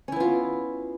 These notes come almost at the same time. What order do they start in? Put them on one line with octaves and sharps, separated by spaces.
C#4 E4 B3 F4